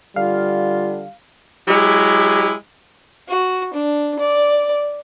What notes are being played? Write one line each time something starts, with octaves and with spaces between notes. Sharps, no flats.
D3 G3 F4 F5
F#3 G#3 E4 G4
F#4
D4
D5